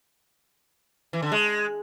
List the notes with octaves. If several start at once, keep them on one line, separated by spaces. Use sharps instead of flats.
E3
D3
G#3